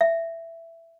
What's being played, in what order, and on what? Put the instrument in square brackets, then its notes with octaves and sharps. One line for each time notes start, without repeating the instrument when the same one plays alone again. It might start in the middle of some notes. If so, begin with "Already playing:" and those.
[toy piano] E5